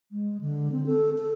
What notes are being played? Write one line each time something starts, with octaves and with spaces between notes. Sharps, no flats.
G#3
D3
C4
A4
A4